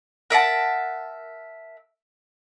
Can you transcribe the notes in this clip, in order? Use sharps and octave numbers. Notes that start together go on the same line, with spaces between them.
A#4 E5 F#5 A5